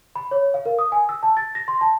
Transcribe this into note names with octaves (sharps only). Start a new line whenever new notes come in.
B5
C#5
F5
A#4
D#6
G#5
E6
A5
A6
A#6
C6
A5